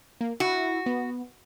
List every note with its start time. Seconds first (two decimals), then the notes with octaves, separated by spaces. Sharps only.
0.21 A#3
0.40 E4 F#4
0.86 B3